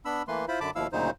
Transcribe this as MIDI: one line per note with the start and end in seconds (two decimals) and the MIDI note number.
0.05 0.23 59
0.05 0.23 62
0.05 0.23 83
0.05 0.23 88
0.28 0.45 52
0.28 0.45 57
0.28 0.45 58
0.28 0.45 71
0.28 0.45 84
0.48 0.60 64
0.48 0.60 65
0.48 0.60 72
0.48 0.60 83
0.61 0.71 42
0.61 0.71 50
0.61 0.71 81
0.61 0.71 83
0.61 0.71 86
0.75 0.87 39
0.75 0.87 47
0.75 0.87 53
0.75 0.87 64
0.75 0.87 77
0.75 0.87 88
0.93 1.10 38
0.93 1.10 46
0.93 1.10 49
0.93 1.10 54
0.93 1.10 63
0.93 1.10 72